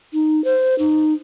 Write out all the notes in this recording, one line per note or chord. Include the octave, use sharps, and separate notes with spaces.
D#4
C5
D#4